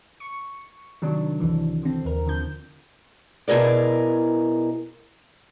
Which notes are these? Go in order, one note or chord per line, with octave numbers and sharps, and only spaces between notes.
C#6
C3 D#3 F#3 D4
C2 F2 D3 E3
D3 C4
D#2 A#4
D3 F3 G6
B2 E4 G#4 A#4 D5